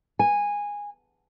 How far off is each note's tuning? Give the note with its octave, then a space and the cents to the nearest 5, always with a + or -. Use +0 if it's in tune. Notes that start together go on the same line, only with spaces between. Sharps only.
G#5 -15